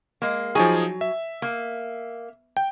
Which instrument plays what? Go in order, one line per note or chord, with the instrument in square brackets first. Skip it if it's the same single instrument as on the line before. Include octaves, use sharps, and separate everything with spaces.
[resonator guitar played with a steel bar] G#3 A#3
[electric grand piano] F3 D#4 G#4 [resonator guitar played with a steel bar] F#3 G#5
[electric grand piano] E5
[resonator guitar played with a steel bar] A#3
[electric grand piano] G5